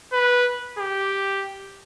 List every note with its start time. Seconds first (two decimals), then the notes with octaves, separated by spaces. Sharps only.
0.13 B4
0.78 G4